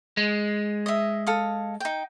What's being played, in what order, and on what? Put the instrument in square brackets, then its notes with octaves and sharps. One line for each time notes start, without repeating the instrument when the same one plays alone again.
[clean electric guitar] G#3
[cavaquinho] D#5 E5
A4 F5 D#6
D#4 G5